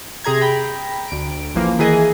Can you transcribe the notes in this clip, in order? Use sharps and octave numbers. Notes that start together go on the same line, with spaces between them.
C3 G#4 A#5 G#6
G5 A#5 B5
D2 D7
A1 E3 F3 A#3
D#3 E3 G#4 D#5